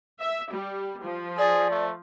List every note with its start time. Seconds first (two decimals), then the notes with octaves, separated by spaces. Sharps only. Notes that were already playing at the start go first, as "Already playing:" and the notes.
0.20 E5
0.52 G3
1.03 F3
1.38 G#4 D5
1.71 A3